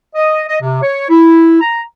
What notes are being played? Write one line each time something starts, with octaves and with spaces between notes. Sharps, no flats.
D#5
D#5
C3
C#5
E4
A#5